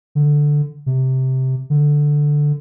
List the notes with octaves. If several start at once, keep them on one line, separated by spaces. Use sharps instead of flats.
D3
C3
D3